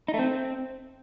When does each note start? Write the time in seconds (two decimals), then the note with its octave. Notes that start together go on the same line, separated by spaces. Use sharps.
0.08 D#4
0.14 A3
0.19 C4